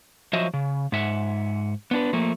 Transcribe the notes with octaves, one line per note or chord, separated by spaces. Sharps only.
F3 F#3 F#4 C5 D#5 E5
C#3
G#2 E5 F#5
B3 D4 B4
F3 A3 A#3